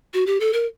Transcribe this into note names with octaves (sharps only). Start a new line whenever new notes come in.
F#4
G4
A4
A#4